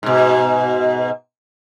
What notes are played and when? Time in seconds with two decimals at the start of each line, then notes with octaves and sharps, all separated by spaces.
0.03 G#2 B2